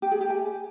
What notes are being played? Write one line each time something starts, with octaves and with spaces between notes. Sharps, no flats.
G4
G#4
G4
G#5